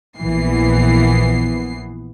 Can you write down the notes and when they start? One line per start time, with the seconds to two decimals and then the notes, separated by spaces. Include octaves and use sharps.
0.20 A#1 E3 B3 C7